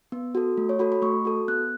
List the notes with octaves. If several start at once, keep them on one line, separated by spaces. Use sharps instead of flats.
B3
F#4 A4
A3
C#5
F#4 A4 B5
B5
A3 C#6
F#4 A4
B3 F#6